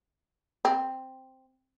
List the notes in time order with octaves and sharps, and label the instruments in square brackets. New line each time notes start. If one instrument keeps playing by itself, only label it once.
[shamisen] C4